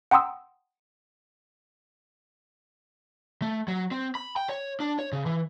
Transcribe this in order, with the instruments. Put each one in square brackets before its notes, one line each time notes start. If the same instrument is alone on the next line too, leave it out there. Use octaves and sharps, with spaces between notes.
[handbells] F#5 G5 A#5 C6 D#6 E6
[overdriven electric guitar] A3
F#3
C4
B5
G5
C#5
D4
C#5
C#3
E3